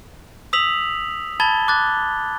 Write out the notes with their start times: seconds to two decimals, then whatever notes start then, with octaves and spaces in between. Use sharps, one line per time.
0.53 D#6 E6 B6 F7 F#7
1.40 A5 B5 G#6 A6 G7
1.68 D6 F#6 A6